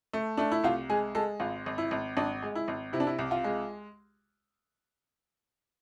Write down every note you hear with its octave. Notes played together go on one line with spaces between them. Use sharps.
A3
A3 D4
E4
C2 F4
G#3 G#4
G#3 A4
G#1 F4
G#1
E4
G#1
G#1 D4
G#3
E4
G#1
C3 E4
D4
E4
C2
F4
G#3